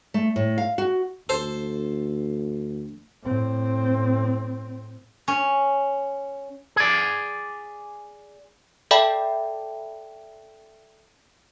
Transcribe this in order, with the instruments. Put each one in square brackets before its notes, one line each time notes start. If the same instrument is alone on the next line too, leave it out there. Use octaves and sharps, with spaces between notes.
[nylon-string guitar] A3
A2
F5
F#4
[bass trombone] D2 [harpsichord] A4 C5
[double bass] A2 C4
[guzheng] C#4
[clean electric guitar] G#4 D5
[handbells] A4 D5 E5 G5 A5 B5